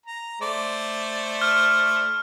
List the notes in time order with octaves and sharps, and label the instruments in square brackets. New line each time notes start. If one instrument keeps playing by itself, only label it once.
[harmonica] A#5
A3 C5 D5
[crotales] F6